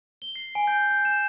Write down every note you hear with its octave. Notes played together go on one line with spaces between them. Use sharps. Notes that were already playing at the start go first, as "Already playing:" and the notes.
G7
C7
G#5
G6
G6
E7